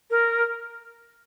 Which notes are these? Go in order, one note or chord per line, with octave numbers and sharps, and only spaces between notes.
A#4